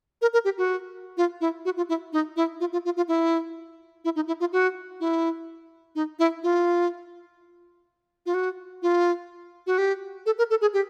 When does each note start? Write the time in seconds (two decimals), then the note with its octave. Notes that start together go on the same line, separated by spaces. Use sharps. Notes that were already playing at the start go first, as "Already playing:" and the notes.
0.22 A#4
0.33 A#4
0.45 G4
0.58 F#4
1.17 F4
1.41 E4
1.65 F#4
1.77 F4
1.89 E4
2.13 D#4
2.36 E4
2.60 F4
2.73 F4
2.85 F4
2.97 F4
3.08 E4
4.05 E4
4.16 D#4
4.27 E4
4.40 F4
4.52 F#4
5.00 E4
5.95 D#4
6.19 E4
6.43 F4
8.26 F4
8.34 F#4
8.82 F4
9.67 F#4
9.78 G4
10.26 A4
10.38 A#4
10.50 A4
10.61 G#4
10.73 G4